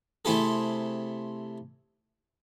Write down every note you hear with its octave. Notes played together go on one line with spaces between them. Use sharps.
C3 A3 C4 E4 G#4 A4